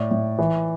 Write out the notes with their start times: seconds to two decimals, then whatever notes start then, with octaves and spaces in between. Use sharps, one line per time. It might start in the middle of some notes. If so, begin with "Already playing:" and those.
Already playing: A2 D5
0.11 A2
0.39 E3